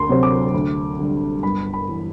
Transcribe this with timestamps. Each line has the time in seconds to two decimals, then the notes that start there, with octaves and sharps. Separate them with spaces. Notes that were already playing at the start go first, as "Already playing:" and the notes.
Already playing: D2 C6
0.09 C3 F#3 C4
0.23 D6
0.54 D2
0.99 D3 G3
1.43 G1 B5
1.73 B5
1.88 E3